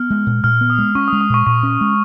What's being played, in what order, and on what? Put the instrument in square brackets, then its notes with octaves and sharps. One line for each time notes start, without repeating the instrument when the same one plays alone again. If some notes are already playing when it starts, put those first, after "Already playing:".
Already playing: [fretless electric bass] B3 [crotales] F6
[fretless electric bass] G#3
A#2
[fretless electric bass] A#2 [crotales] F6
[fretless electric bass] B3
[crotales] D#6
[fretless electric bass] G#3
[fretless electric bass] C#4 [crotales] C#6
[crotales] D#6
[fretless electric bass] G#3
[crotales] D#6
[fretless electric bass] A#2 [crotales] C#6
[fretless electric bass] A#2 [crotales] C#6
[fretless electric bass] C#4
G#3